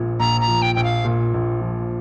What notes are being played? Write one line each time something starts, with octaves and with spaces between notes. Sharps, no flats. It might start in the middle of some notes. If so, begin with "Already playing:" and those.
Already playing: A#1 A#2 F3
A#1 A#5
A#5
F3
G5
A#1 G5
F5
A#2
A#1
F3